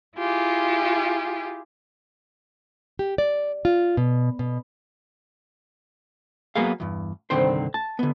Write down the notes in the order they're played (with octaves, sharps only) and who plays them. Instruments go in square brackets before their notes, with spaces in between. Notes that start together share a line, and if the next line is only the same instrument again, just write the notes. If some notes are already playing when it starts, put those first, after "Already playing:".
[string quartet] E4 F4 G4 G#4
[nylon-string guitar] G4
D5
F4
B2
B2
[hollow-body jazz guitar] F#3 A#3 B3 G#4 F5
E2 G2
C2 G2 D3 D#3 C4 C5
A5
D3 B3